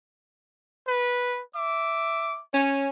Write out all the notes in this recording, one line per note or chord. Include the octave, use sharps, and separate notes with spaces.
B4
E5 D6
C#4